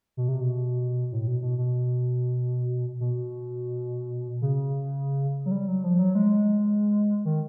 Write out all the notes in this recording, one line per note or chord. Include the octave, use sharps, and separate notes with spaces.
B2
C3
B2
A2
B2
B2
B2
B2
C#3
F#3
G3
F#3
F3
F#3
G#3
D#3